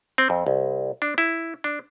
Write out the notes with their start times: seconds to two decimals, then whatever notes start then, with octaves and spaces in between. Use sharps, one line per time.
0.18 C4
0.30 F2
0.47 C2
1.02 D4
1.18 E4
1.64 D4